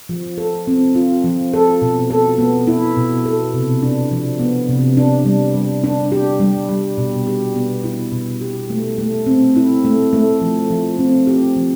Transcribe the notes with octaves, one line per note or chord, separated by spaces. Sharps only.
F3
A4
C4
F4
F3
A4
B2
A4
B3
E4
B2
A4
C3
D4
F3
B3
C3
D4
G3
G3
D4
G4
G3
G3
B2
G4
B3
E4
B2
G4
A3
A3
C4
E4
A3
A3
F3
F3
C4
G4
F3